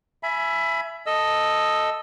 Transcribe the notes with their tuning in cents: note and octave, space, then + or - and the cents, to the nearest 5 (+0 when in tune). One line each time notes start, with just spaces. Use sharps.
E5 +20 G#5 +20 B5 -10
A4 +0 D#5 +0 E6 +0